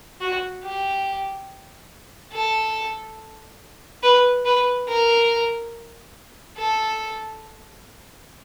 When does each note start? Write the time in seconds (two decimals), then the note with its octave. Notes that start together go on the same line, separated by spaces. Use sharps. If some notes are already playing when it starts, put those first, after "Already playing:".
0.21 F#4
0.64 G4
2.33 A4
4.03 B4
4.45 B4
4.87 A#4
6.57 A4